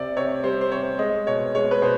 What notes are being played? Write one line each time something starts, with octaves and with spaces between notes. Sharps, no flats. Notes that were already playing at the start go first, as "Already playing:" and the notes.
Already playing: C3 D5
C3 C#5
G3 C5
C5
C3 C#5
G#3 D#5
B2 C#5
G#3 C#5
B4
B2 C5